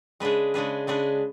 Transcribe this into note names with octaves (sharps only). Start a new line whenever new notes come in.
C#3 G#3 D4 G#4 B4
C#3 G#3 D4 G#4 B4
C#3 G#3 D4 G#4 B4